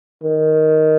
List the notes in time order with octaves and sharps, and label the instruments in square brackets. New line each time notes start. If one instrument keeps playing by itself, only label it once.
[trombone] D#3